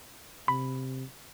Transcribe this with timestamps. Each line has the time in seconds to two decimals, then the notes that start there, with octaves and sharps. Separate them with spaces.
0.48 C3 B5